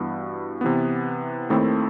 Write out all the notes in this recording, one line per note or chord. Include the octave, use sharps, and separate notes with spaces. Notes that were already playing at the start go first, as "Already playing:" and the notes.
Already playing: G2 E3 B3 F#4
C3 E3 B3
D#2 D#3 A3 C4 E4